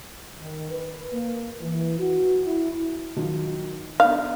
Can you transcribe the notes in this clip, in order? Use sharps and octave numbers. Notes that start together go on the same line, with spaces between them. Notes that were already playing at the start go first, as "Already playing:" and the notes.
D#3
B4
A#3
E3
F#4
E4
D#3 F3 F#3
B3 D4 D#4 F5